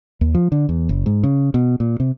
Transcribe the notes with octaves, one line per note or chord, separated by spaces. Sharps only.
D#2
F3
D3
E2
F#1
G#2
C#3
B2
A#2
C3